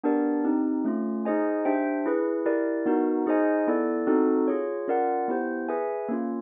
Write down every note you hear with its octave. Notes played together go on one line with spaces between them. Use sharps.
B3 D4 G4 A#4 D5
C4 D#4 G4
A3 C#4 F4
D#4 G#4 C5 D#5 G#5
D4 G4 C5 E5 G5
E4 G#4 B4
E4 G4 A#4 D5
B3 D#4 F#4 A#4
D#4 G#4 C5 D#5 G#5
B3 E4 A4 D5
C4 D#4 F#4 A4
F4 G#4 C#5
C#4 F4 A#4 D5 F#5
B3 E4 G4 C5
G#4 B4 E5 G#5
A#3 C#4 F4